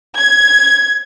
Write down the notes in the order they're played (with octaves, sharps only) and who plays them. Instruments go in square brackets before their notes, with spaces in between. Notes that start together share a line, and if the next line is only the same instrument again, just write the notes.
[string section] G#6